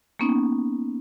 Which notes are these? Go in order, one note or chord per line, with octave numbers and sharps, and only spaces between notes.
A#3 B3 C#4 D#4